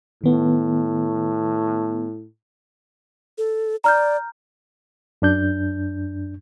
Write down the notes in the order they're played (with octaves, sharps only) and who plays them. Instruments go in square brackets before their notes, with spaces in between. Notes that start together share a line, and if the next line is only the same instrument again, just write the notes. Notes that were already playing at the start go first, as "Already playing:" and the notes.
[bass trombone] A2 [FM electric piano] D#3 B3
[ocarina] A4
[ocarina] D5 [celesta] A#5 F6 G6
[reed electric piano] F#2 D4 G6